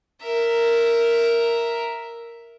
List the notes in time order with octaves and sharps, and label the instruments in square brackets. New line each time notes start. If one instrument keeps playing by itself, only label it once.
[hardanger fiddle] A#4 E5